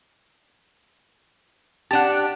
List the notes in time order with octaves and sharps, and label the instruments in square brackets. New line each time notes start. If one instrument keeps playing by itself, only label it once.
[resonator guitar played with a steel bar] D4 G4 [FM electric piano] F#5 A5